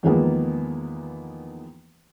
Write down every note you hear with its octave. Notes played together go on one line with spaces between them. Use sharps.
E2 D#3 F3 G#3 A#3 B3